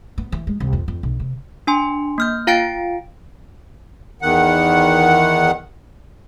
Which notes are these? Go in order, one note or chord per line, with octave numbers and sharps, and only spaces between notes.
B3
E3
G#3
C2
F2
F2
B1
C3
D4 G#5 C6
A#3 F6 G6
F4 F5 G5 A6 D7
E2 D#3 F#5